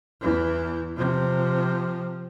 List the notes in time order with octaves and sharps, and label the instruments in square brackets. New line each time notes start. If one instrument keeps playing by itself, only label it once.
[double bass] E2 E3
C3 F3